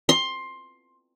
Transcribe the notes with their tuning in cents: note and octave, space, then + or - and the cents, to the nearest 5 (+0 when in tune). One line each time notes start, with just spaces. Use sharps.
C6 +15